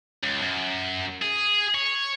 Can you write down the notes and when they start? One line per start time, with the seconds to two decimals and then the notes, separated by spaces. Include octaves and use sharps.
0.23 C#2
0.42 F#2
1.22 G#4
1.75 C#5